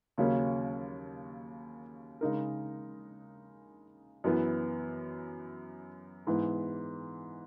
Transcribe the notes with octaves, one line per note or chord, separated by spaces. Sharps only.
D#2 C#3 F#3 A#3 C#4
C#3 G#3 D#4 A#4
F#2 E3 B3
G#2 E3 B3